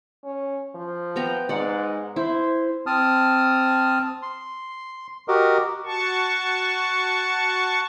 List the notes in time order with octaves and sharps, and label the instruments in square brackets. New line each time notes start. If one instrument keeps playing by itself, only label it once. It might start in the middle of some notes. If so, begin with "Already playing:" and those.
[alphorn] C#4
F3
[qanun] B3 G5 A#5
[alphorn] G#2 [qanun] D5 F#5
[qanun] E4 [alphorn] C5
[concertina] C4 A5 D#6 F6
C6
F#4 G4 A#4 D#5
[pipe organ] F#4 A5 C#6